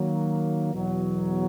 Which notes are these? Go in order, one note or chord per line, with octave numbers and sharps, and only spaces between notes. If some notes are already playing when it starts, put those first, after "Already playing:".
Already playing: D#3 F#3 A#3
E2 B2 F#3